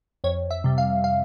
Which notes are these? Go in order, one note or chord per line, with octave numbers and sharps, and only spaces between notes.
F2 C#5
E5
C3 G3
F5
F5